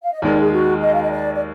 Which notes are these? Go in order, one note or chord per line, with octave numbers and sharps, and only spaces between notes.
F5
D#5
D#2 D#3 G#3 D#4 A#4 D5
G#4
F#4
D#5
F5
D#5
D5
D5